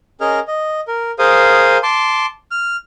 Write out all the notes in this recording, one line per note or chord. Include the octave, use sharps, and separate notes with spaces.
C#4 G#4 A#4 D#5 F6
D#5
A#4
G#4 A#4 C5 F5 D#6
A5 C6 D6
F6